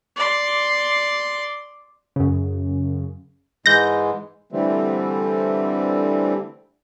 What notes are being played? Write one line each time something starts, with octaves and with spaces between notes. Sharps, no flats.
D5 C6
F#2 C#3
G#2 E3 G#3 G6 A#6
D3 E3 G3 A3 C4